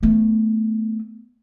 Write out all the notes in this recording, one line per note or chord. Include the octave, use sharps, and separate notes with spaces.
A3 B3